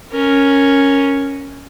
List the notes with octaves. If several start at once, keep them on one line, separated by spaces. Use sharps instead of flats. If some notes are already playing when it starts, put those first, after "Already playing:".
C#4 A#4